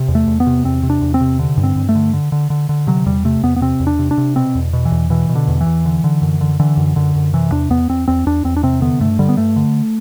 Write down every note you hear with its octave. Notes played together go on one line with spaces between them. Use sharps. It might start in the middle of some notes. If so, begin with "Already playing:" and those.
Already playing: C3
E2
A3
E2
B3
C3
E2 C4
C3
D4
E2
C4
C3
D3
G2
C4
G2
A3
D3
D3
D3
D3
D3
C3 F#3
E2 G3
C3 A3
E2 B3
B3
C3 C4
E2
D4
C3
D4
C3
B2 C4
E2
B2
E3
E2
B2 E3
B2
D3
E2
E3
E2
D3
D3
F#2
D3
D3 E3
F#2
F#2 D3
F#2
C3 E3
E2 D4
E2 B3
E2 C4
E2 C4
E2 D4
E2 C4
D4
C3 C4
D3 B3
G2 A3
D3 G3
B3
G2 A3
D3